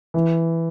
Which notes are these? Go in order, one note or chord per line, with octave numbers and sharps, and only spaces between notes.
E3